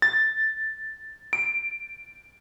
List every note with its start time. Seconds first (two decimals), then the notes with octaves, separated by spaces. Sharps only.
0.02 A6
1.33 D7